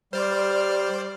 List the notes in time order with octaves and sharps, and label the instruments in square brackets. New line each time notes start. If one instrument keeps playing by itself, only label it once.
[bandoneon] G3 F6 [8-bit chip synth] C5 D5